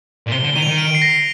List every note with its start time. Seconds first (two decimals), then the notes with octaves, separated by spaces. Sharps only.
0.27 A#2
0.32 C3 G7
0.44 D3
0.55 D#3 D#7
0.62 F7
0.68 D#3 D#7
0.78 D7
0.95 C7
1.02 A#6